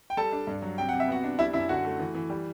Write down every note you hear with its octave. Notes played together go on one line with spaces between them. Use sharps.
G5
G3 A4 A5
D4
G2
F#3
C3 G5
C3 F#5
E5
B3 F#4 F#5
D4
G3 E4 E5
F#2 E4 E5
D3 F#4 F#5
A3
E3
E3
G3